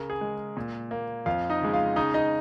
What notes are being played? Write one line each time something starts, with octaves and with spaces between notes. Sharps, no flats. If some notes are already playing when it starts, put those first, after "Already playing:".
Already playing: C#3 A#4
G#4
G#3
A#2
A#3
F2 F4 F5
D#4 D#5
C#3 G#3
F4 F5
C#3 D#4 D#5
D#4 D#5